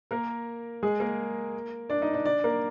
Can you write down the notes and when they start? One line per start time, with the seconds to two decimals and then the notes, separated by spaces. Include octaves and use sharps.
0.11 A#3 A#4
0.83 G#3 G#4
1.00 A#3 A#4
1.90 D4 D5
2.02 D#4 D#5
2.13 D4 D5
2.25 D4 D5
2.44 A#3 A#4